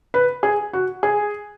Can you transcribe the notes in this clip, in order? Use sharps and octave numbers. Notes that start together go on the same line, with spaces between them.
B4
G#4
F#4
G#4